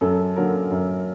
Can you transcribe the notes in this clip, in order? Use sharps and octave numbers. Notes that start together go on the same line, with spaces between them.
F#2 A4
D3 F#3 A#3 A#4
F#2